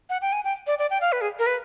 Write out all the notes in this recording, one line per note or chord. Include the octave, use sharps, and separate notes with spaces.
F#5
G5
G#5
G5
D5
D5
G5
F5
B4
G#4
A#4
B4